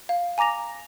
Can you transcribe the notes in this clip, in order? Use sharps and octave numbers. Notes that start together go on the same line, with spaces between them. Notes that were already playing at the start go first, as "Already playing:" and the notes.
F5
G#5 A#5 D6 A#6 F7